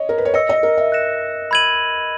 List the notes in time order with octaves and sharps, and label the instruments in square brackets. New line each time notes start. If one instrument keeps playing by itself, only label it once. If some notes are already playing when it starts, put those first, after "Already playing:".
Already playing: [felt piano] C#5 D#5
A#4
B4
C#5
[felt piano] D#5 [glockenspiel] E6 A#6 C#7
[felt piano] D#5
A#4
E5
[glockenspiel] F#6 A#6 C#7 E7
B5 E6 G#6 D#7 F#7